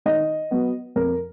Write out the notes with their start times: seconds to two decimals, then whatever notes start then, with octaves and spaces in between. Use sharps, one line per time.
0.06 D#3 D#5
0.51 F#3 B3
0.96 F2 A#4